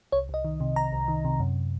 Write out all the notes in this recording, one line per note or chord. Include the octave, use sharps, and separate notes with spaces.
C2 C#5
C2 D#5
D#3
C3
C2 A#5
C2
D#3
C3
F#2